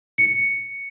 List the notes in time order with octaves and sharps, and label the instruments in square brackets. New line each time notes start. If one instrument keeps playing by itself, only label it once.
[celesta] C#7